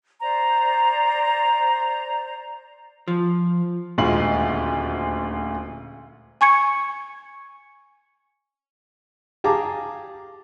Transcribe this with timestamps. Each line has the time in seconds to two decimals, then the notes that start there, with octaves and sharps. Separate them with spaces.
0.21 C5 D5 A#5
3.08 F3
3.98 D#1 D2 G#3 F4 C6 F#7
6.41 G#5 C#6 G#6 C#7
9.44 G4 G#4 F5 A5 A#5 D6